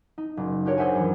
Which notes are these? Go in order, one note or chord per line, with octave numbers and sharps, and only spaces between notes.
D#4
F#1
D4 F#4 G4 A#4 C#5
G#4 C5 E5 F#5 G#5
F#2 E3